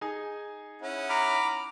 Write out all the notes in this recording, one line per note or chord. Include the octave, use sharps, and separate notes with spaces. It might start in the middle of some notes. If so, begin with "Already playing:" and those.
D#4 G#4 G#5
C#4 E4 F#5
A#5 B5 D6 F6